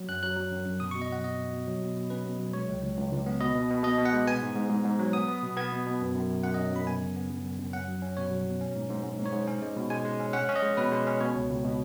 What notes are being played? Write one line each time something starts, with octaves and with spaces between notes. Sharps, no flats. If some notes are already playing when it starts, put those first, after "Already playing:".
Already playing: F#3
F#2 F#6
F#3 F#6
F#3
F#2
F#2
B2 D#6
C#6
B2
D#5
F#3 F#5
B2 D#5
B2
B2
F#3
B2
B2
C#4 B4
B2
F#3
G#3 C#5
C#2
C#2
C#2
C#2
B3
B2 D#5
B2
B2
B2 D#5
B2
F#5
G#3
B3 G#5
G#2
G#2
G#2
G#2
F#3
B3 D#6
B3
B2
B3 G#6
B2
B2
F#2
F#2
F#2
F#2 F#5
D#5
C#4
F#2 B5
B3 G#5
C#3
B3
F#2
F#2
F#2
C#4 F#5
F#3
C#4
B2 C#5
F#3
B2
C#4
G#2
G#2
G#2
G#2
C#5
G#2
C#4
G#3
B2
G#3 G#5
G#3
C#4
C#4 F#5
C#4
D#5
G#3
B2 B4
G#3
C#4
B2 C#5
C#2
C#2
B2